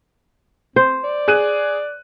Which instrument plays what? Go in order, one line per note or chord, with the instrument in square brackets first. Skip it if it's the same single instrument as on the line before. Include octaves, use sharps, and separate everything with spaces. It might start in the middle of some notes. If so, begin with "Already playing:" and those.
[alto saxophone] C4 [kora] C5
[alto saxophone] D5
[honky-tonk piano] G#4 F#6 D#7